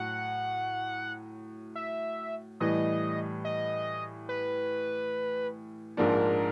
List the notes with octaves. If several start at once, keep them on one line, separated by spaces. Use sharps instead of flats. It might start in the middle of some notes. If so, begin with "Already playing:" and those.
Already playing: A2 F#3 F#4 F#5
E5
A2 E3 G3 D#5
D#5
B4
A#1 G#2 F3 A#3 D4 A#4